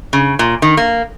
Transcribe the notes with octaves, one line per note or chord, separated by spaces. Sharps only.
C#3
A#2
D#3
A#3